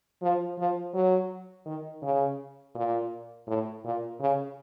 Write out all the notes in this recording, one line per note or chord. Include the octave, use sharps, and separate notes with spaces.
F3
F3
F#3
D#3
C#3
A#2
A2
A#2
C#3